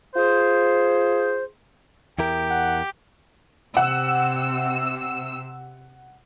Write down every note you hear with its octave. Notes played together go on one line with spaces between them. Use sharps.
F4 G#4 C5
E2 E4 G4 A#4
F#5
C3 F#5 E6